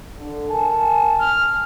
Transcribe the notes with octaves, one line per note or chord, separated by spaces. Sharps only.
D3
A#4 G#5 A5
F6